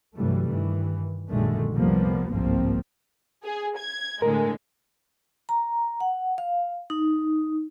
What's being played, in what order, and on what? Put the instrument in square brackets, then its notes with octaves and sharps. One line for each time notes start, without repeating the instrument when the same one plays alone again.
[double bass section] G2 C3 E3 F#3 G3 A3
G2 D#3 E3
A#1 F#2 D3 D#3 G#3 A3
C2 F2 F3 G3 A#3 B3
G1 C2 G#2 F3 A#3 C4
[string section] G#4
G#6
[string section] A2 D3 G#3 [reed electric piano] A#4
[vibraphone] A#5
F#5
F5
D#4